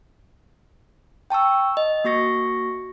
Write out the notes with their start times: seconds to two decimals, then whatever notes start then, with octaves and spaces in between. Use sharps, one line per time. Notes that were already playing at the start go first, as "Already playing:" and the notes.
1.30 G5 A5 C#6 E6
1.77 D#5
2.04 A#3 F#4 C#6 A#6 C#7